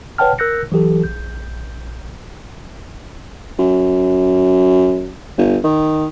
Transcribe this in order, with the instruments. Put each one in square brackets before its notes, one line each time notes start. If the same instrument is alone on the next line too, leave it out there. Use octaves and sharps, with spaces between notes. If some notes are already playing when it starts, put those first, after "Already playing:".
[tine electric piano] B4 C#5 F#5 G5 A5 F6
A#4 E6 F#6 G6 A#6 C#7
E3 F#3 G4 A4
A#1 G6
[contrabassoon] F#2
G1
D#3